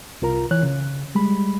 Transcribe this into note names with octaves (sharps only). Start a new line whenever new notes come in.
C2 F4 A#4 A#5
E3 C#5 F#6
C#3
G3 G#3 B5